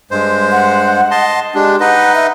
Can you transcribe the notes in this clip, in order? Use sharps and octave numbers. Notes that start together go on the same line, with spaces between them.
G2 G#3 C5
F#5
D#5 A5 C6
G#3 D4 G4
D#4 B4 D#5 F#5
E5